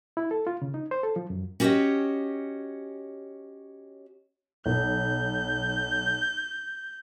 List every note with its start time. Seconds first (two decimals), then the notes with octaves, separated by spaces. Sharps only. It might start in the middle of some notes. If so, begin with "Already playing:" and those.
0.17 E4
0.31 A4
0.47 F4
0.62 C#3
0.74 D#4
0.91 C5
1.03 A4
1.16 F3
1.30 F#2
1.60 C#4 F#4 G4 A#4 C#5 D#5
4.66 B1 G6